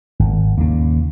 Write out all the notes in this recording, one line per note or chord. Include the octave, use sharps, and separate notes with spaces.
G#1
D#2 C#3